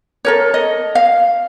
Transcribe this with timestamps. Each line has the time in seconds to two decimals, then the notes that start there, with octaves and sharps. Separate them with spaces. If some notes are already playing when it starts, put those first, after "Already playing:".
0.25 A4 A#4 C#5
0.54 D#5
0.95 F5